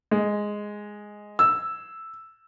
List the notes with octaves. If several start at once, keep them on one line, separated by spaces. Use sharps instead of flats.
G#3
E6